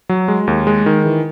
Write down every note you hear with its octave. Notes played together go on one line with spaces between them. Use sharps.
F#3
G#3
D#2
G#3
D#3
E3